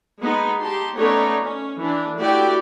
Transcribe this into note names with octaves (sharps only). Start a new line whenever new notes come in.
G#3 B3 D#4
D#4 G4 A5 C6
A3 B3 C#4 D#4 C#5 D5
C#4
E3 D4
A3 E4 F#4 G4 D5 G5